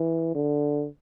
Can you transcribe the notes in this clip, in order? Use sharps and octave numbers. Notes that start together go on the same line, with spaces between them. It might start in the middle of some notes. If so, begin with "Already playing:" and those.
Already playing: E3
D3